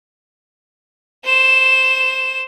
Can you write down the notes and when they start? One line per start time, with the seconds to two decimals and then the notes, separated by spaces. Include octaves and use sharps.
1.25 C5 E7